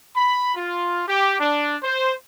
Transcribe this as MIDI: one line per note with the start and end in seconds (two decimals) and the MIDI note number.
0.15 0.55 83
0.56 1.03 65
1.07 1.38 67
1.40 1.76 62
1.83 2.13 72